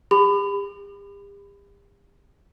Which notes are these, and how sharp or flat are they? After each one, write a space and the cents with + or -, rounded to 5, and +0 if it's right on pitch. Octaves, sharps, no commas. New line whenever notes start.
G4 +40 B5 +25